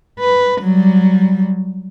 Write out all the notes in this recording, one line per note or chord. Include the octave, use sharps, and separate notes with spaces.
B4
F#3 G3